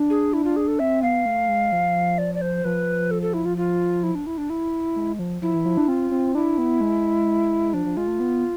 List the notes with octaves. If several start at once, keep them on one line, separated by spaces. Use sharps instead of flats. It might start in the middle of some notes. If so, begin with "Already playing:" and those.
Already playing: D4
G#4
E4
F4
G#4
A4
C4 E5
B3 F5
A3
G#3
F3
D5
D5
C5
F3 B4
A4
A4
E4
F4
F4
E4
D4
E4
D4
E4
G#3
F3
F3 E4
E3
F3
D4
C4 F4
C4
D4 E4
B3
G#3
F3 D4
F3
G#3 F4
A3
B3